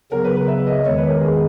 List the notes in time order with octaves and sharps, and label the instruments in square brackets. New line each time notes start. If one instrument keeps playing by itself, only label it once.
[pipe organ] C#3 F#3 B3 [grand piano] A#4
[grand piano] B4
B4
E5
D#5
[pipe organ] E2 D#3 G#3 [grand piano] C#5
[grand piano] B4
A#4
G#4